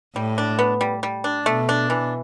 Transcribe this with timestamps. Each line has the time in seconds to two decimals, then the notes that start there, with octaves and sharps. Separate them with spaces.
0.16 A2 G3
0.38 D4
0.59 B3
0.81 G3
1.03 G3
1.24 D4
1.46 B2 A3
1.69 D4
1.90 E3